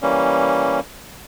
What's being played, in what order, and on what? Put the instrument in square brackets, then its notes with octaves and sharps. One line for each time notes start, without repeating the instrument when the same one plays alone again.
[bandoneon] E3 G3 A#3 C#4